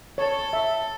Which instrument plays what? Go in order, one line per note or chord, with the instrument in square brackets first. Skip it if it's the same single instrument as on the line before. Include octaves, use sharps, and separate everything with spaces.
[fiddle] A4 [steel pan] C#5
[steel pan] E5